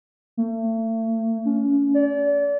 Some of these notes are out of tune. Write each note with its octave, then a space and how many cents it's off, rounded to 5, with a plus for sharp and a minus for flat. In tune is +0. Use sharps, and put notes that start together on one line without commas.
A3 +35
C#4 +35
D5 -35